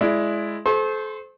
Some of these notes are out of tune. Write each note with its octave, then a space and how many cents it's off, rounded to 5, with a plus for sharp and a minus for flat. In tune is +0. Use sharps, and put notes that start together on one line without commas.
G#3 +15 E4 +15 D5 +0
A4 -35 C5 -15 C6 +45